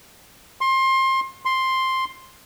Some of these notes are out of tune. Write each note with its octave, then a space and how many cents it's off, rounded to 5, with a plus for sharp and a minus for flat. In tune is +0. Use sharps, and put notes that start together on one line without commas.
C6 +25
C6 +5